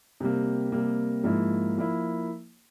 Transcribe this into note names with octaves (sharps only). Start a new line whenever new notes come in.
C3 G3 A#3
C3 G3 A#3
G#2 F3 A#3 E4
F3 A#3 E4